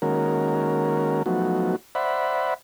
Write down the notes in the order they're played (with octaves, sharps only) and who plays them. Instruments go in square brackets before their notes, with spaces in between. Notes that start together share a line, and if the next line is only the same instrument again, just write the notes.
[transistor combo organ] D#3 G#3 A#3 C#4 F#4 A#4
F3 F#3 A3 B3 D#4 F#4
C5 D5 E5 F#5 B5